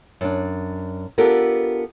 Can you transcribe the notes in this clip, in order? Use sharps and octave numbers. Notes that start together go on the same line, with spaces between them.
F#2 D4
B3 D4 F4 G4 A4 A#4